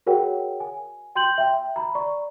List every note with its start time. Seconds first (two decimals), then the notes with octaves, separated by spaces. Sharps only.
0.07 F#4 G#4 A#4 C#5 F#5 G5
0.60 G#5
1.15 G5 C6 G6 F#7
1.38 E5 G5
1.76 A#5 B5
1.95 D5 A#5 C#6